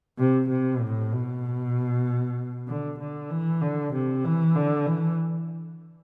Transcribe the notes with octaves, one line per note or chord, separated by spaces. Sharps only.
C3
C3
A2
B2
D3
D3
E3
D3
C3
E3
D3
E3